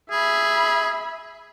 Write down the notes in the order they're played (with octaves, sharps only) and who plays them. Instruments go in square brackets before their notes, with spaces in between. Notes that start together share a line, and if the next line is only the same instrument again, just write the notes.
[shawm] G#4 [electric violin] E5 B5